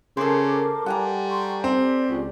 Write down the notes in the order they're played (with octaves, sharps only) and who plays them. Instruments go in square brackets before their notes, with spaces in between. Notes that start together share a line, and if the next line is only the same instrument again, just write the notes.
[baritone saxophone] C#3 [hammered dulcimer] A4 C5 [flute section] A#4 D6
[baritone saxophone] G3 [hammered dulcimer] F#5 G#5 A#5
[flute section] C6 C#6
[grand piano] C4 [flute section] G4 D5
[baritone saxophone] C#2